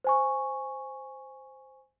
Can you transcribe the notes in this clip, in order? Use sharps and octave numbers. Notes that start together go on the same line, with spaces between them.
C5 G#5 C#6